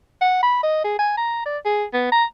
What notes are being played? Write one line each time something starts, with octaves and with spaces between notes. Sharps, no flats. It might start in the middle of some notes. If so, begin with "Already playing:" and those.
F#5
B5
D#5
G#4
G#5
A#5
D5
G#4
B3
A#5